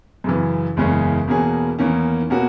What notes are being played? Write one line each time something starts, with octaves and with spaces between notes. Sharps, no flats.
F#2 C#3 E3
F#1 E2 C#3 G#3 C#4
E2 B2 A#3 C#4 G#4
E2 D#3 A#3 C#4
B2 A#3 C#4 F#4